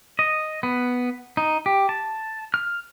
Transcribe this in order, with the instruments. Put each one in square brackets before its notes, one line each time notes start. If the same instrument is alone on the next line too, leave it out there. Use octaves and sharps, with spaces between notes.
[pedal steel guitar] D#5
B3
D#4
G4
A5
F6